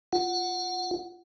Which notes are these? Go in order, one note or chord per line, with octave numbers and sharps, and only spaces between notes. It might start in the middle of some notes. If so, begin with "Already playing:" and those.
F4 F#5